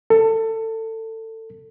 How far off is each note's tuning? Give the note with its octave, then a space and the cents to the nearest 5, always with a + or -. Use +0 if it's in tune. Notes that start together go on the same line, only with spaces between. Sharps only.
A4 +25